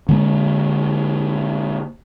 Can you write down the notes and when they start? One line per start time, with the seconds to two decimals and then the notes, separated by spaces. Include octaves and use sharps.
0.09 D3 G#3 A#3